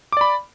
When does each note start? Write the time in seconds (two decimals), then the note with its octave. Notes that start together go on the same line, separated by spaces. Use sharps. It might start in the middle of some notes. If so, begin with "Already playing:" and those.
0.12 D6
0.17 D5
0.21 B5